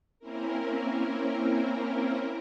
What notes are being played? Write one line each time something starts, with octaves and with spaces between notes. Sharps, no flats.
A#3 C4 C#4 E4 A#4